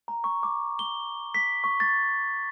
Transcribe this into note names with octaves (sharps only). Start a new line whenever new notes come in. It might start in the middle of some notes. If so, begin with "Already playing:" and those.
A#5
C#6
D6
G7
B6
C#6
A6